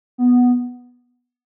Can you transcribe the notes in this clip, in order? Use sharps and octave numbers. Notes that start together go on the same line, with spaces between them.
B3